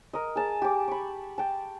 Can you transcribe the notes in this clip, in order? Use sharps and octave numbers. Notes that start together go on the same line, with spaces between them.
A#4 D#5
G#4 A5 A#5
G4 D6
B5 C#6
G5 A5